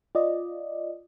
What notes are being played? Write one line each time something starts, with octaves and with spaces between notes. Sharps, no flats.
F4 D5 D#5